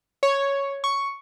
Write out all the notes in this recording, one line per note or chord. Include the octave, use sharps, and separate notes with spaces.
C#5
C#6